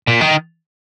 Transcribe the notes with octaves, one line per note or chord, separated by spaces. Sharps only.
A#2
D#3